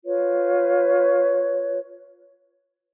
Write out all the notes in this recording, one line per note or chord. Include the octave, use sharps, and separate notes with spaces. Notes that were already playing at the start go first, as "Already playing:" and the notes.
F4 B4 C#5